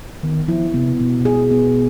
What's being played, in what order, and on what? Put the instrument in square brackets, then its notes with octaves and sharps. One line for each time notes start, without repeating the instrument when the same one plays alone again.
[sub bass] D#3 [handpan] B3
[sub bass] F3 [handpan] E4
[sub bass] C3 [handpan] B3
[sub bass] B2 [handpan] B3
[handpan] G#4
B3